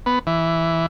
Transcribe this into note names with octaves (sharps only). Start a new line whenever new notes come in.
B3
E3